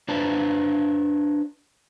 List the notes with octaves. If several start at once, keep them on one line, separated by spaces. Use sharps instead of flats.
D4 B4 C5 A5 A#5